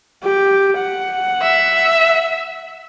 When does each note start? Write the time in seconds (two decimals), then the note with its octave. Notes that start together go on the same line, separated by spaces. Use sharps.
0.24 G4
0.78 F#5
1.42 E5